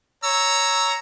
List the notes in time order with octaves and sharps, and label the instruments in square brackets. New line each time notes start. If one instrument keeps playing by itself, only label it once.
[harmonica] C#5 A#5 E6